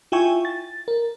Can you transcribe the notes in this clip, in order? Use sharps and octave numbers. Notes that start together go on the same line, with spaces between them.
E4 F4 E5 G5 G#5 C#6
A6
A#4